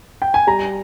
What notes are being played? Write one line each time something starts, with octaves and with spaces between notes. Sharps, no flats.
G5
G#5
G3 A#5